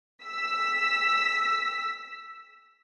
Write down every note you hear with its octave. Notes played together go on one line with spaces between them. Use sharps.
E6 B6